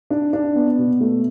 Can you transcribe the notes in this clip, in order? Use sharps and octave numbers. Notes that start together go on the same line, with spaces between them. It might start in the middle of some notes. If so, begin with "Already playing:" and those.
D4
D4
B3
B2
A3